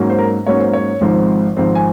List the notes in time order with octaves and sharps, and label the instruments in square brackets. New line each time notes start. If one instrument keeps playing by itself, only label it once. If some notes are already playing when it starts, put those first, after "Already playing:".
Already playing: [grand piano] G#2 F#3 A#3 C#4
C5
A#4
G#2 F#3 A#3 C#4 C#5
C5
C#5
G#1 G#2 F3 C4
G#1 G#2 F3 C4
G#5